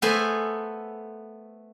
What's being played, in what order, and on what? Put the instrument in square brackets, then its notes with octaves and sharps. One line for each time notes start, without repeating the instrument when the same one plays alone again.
[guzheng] A3 B3 A4 C5 E5 G#5